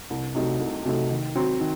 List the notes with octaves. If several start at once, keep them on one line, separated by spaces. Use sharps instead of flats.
C2
C3 F#3 A3 D#4
C2
C3 F#3 A3 D#4
D#3
F#3 C4
D#3